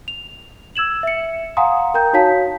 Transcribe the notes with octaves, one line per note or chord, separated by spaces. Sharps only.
F7
E6 G#6 E7 F#7
E5 C#7
F5 F#5 G#5 A#5 C6 D#6
A#4 G5 A#5 G6
D#4 F#4 C#5 F5 A5 B6